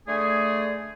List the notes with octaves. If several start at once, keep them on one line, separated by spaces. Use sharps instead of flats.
D3 A3 G#4